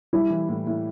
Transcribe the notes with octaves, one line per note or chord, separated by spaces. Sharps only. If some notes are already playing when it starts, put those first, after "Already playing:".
G3 E4
E3
A2
A2